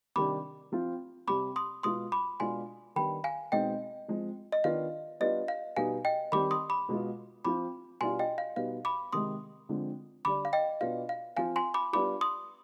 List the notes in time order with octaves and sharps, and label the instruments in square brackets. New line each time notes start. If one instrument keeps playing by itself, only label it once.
[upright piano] C3 D#3 G3 D4 [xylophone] B5 D6
[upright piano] F3 C4 F4
[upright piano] C3 G3 C4 [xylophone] B5 D6
[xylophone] C6 D#6
[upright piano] B2 G#3 B3 F4 [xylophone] C6 D#6
[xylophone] B5 D6
[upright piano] B2 G#3 D4 F4 [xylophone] G#5 C6
[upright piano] D#3 G3 B3 D4 [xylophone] G5 B5
[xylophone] F5 G#5
[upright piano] B2 G#3 C4 D#4 [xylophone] D#5 G5
[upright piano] F3 G#3 C4
[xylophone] D#5
[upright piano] D#3 B3 D4 F4 [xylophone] F5
[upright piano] G3 B3 D4 F4 [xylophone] D#5
[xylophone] F5
[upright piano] B2 G3 B3 D#4 [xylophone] F5 G#5
[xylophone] D#5 G5
[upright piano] D#3 G3 C4 [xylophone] B5 D6
[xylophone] C6 D#6
B5 D6
[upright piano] B2 G#3 B3 F4
[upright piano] F3 C4 F4 [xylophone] B5 D6
[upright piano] B2 G3 D4 F4 [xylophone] G#5 C6
[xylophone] D#5 G5
F5
[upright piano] B2 G3 B3 D#4 [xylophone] F5
[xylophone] B5 D6
[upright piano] C3 D#3 G#3 [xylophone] C6 D#6
[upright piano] D3 F3 G#3 C4
[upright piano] D3 G3 D4 [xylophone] B5 D6
[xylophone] F5
D#5 G5
[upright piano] B2 B3 D4 F4 [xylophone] F5
[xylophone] F5
[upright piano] F3 C4 F4 [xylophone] F5 G#5
[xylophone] G#5 C6
B5 D6
[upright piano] G3 B3 D4 F4 [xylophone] B5 D6
[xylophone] C6 D#6